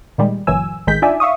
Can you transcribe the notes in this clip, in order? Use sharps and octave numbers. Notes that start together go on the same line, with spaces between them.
A#2 D#3 G3 G#3
G1 A#2 E3 F#3 G#5 E6
A1 D#3 G#3 G6 B6
D4 D#4 F4 D5 E5 G#5
E5 F5 C#6 D#6